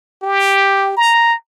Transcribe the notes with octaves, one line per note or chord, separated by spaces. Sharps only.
G4
A#5